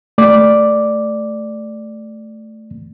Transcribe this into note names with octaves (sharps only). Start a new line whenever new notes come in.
A3 D5 D6